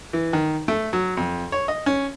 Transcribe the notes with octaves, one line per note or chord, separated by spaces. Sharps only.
E3
D#3
A3
F#3
F2
C#5
D#5
C#4